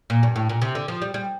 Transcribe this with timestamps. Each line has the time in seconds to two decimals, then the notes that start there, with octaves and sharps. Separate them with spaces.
0.10 A#2
0.23 G2
0.36 A2
0.49 A#2
0.62 C3
0.75 D3
0.88 F3
1.02 G3
1.14 G3